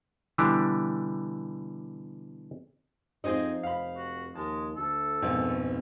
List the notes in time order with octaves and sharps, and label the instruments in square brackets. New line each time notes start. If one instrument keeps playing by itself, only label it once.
[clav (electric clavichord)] B2 D3 E3 G3 D4 G4
[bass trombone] F2 [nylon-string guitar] F3 C5 D#5 [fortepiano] C4 D#4 G#4
[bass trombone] F1 [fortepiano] F5 B5
[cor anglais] F#4
[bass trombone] D#2 [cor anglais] G#3 [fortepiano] A5
[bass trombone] D2 [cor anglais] A4
[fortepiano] A#1 [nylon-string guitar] F2 B2 [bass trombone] G#2